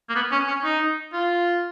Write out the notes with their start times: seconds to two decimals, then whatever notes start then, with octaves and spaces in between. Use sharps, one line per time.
0.09 A#3
0.15 B3
0.32 C#4
0.48 C#4
0.64 D#4
1.13 F4